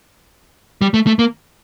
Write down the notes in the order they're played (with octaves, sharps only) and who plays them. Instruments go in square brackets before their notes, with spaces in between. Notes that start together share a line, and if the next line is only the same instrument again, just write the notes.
[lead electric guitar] G3
A3
A3
A#3